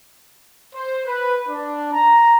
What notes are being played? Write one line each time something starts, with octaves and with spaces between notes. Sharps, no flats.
C5
B4
D4
A#5